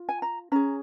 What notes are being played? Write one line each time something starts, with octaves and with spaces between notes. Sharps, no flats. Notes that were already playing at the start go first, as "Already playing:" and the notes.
Already playing: F4
G#5
A#5
C#4 G#4 A#5